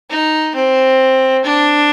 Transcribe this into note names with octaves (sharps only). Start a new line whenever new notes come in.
D#4
C4
D4